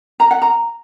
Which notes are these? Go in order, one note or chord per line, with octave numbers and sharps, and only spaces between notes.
A#5
F#5
A#5